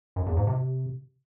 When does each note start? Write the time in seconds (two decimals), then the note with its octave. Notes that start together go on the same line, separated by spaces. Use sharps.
0.16 F#2
0.26 E2
0.37 G#2
0.47 C3